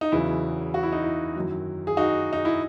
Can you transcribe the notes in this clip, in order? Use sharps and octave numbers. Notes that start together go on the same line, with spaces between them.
D#4
E2 C#3 F#3 B3 E4
F#4
E4
D#4
E4
F#2 D#3 F#3
G#4
D#4 F#4
D#4
E4